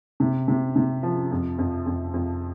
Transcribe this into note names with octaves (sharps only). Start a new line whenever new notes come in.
C3
C3
C3
F3
F2
F2
F2
F2